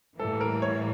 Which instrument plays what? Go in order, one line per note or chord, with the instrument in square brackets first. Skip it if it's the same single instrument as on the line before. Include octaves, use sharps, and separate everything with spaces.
[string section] A2 E3 G3 A#3 [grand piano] A4
[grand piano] A#4
C#5